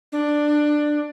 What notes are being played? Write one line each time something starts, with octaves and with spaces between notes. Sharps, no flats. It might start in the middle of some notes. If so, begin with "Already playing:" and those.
D4